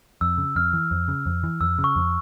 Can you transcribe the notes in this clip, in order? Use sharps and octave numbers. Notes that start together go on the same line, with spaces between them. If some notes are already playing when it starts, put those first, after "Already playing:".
F2 E6
C#3
F2 F6
E3
F2
C#3
F2
E3
F2 E6
C#3
C#6
F2